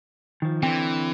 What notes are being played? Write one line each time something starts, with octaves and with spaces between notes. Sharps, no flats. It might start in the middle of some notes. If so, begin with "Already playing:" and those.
D#3 F3
D3 E3 C4 G5